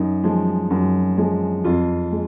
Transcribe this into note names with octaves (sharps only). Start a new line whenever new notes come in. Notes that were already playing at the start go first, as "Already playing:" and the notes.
Already playing: F#2 D#4
F3 G#3
F#2
F3 G#3
F2 F4
G#3